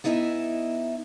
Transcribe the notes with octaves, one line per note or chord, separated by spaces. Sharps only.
B3 D#4 E4 D#5 E5 G#5